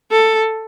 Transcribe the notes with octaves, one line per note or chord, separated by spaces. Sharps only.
A4